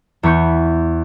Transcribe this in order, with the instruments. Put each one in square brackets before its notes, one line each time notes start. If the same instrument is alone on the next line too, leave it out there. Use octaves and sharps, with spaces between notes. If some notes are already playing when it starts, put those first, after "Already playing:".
[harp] E2 G#5 B5 C#6 G6